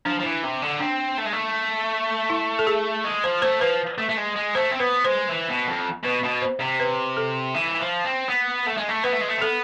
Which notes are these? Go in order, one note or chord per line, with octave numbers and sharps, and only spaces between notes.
F3 D4
F3
E3
C3
D3
C4 D4
A3
G#3
A3
E4
A4
G#4
G#3
F3 C5
A3 C5
F3 B4
A3
A3
G#3
G#3
A3 C5
C4
B3 B4
G#3 C5
E3
B2
F2
B2 B4
B2
C5
C3
B4
A4
E3
F3
C4
B3
A3
G#3
A3
B3 B4
A3
G#3
A3
C4
B3 A4